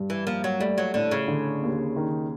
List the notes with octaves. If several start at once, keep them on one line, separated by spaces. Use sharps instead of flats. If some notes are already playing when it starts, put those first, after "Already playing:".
Already playing: G2
E3
F3 A#3
F#3
G3 A3
F#3
A2 D3
C#3
D3
D#2
D#3